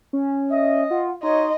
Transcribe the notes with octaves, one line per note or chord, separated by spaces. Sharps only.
C#4
D#5 E5
F4 F#5
D#4 F#4 C#5 D#5 C6